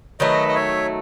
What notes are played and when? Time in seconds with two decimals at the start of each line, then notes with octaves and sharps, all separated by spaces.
0.20 D#3 F#3 A3 B4 D#5
0.48 D#5
0.55 C#5 E5